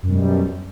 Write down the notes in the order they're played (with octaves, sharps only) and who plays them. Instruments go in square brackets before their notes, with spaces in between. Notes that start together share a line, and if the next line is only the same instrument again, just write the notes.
[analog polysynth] F#2
B2
G3